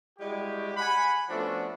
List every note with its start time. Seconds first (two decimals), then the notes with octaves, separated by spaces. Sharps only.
0.19 G3 G#3 E4 F#4 G4
0.77 F#5 G#5 B5
1.29 F3 A3 B3 C#4 D4 F#4